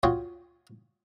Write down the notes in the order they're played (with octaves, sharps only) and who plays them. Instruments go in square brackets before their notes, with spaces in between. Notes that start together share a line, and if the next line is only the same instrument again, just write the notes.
[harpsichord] F4 F#4 C#5 G5 C6 D#6